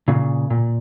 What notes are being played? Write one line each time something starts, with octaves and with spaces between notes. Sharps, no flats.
A#2 C#3
A#2